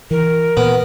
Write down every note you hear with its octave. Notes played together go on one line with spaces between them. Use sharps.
E3 A#4
A#2 B3